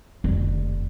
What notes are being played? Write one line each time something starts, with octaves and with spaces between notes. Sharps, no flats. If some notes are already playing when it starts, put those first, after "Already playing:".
F1 D3